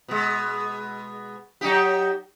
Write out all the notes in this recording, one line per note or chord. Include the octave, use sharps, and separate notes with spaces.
B2 G#3
F#3 D#4 G4